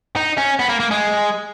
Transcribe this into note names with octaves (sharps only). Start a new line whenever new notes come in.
D#4
C#4
B3
A#3
A#3
G#3